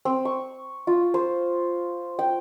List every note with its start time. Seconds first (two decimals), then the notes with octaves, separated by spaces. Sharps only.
0.05 C4
0.25 C#6
0.87 F4
1.14 C5
2.19 G5